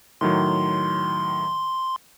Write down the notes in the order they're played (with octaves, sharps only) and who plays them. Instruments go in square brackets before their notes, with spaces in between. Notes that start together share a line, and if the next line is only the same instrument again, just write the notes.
[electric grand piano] A2 D#3 F#3 [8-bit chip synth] C6